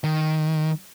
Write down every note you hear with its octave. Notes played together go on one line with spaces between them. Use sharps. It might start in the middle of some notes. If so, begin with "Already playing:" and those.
D#3